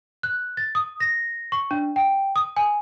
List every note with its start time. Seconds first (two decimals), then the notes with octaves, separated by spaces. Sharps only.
0.23 F#6
0.57 A6
0.75 D#6
1.00 A#6
1.52 C#6
1.71 D4
1.96 G5
2.36 D#6
2.56 G#5